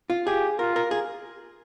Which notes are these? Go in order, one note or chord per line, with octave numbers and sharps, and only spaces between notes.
F4
G4 G#4
F4 A#4
A#4
G#4